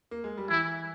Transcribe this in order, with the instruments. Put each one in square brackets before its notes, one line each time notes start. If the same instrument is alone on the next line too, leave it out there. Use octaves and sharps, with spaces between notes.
[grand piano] A#3
G#3
G3
[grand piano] E3 [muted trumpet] E4